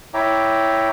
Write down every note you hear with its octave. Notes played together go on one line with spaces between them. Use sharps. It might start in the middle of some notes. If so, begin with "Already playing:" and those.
E4 C#5 E5 G5 A#5 D6